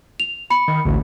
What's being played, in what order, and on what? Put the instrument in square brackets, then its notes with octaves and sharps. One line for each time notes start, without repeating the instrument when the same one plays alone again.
[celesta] F7
B5 C#7
[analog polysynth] D#3
A1 D2